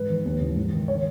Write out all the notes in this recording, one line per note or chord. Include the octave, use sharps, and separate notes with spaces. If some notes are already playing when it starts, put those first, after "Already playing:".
Already playing: G#2 B4
D#3
D#2
C#3 E3
G#2
D#3
C#5